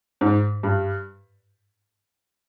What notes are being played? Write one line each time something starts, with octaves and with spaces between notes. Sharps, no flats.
G#2
G2